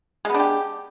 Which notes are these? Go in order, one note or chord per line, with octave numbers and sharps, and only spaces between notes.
G#3 B3 D4 G4